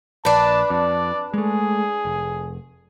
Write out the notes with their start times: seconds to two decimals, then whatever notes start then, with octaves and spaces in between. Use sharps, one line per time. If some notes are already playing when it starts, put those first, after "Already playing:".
0.25 A#1 D4 B4 A5
0.70 F2 D5
1.34 G#3 A3 G#4
2.05 F1